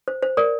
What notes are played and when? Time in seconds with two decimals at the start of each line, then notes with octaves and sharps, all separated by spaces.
0.08 C5
0.22 C5
0.37 A#4 D5